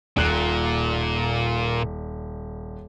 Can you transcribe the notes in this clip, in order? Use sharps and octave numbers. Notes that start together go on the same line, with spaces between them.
D#1 A#2 F#6 C7